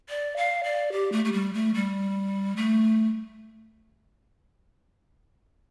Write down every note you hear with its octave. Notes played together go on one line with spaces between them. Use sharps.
D5
F5
D5
G4
A3
A3
G3
A3
G3
A3